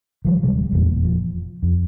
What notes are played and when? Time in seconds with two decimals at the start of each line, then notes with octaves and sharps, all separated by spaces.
0.25 D#3 F3 G3
0.43 D1 C3 G3 G#3
0.72 F1 E2 A#2
1.04 F3
1.63 F2